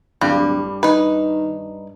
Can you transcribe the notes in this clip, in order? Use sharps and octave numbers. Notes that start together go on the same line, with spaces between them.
D1 G2 G3
D#3 D#4 B4